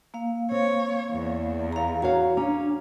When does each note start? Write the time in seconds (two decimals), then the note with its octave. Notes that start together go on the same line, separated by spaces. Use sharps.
0.14 A#3 F5
0.51 C4 C#5
1.12 E2
1.72 F5 A#5
2.02 F#4 C#5 F5 A#5
2.37 C#4 D4